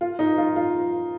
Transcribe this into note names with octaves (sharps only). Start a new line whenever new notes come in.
F4
D#4
F4
F4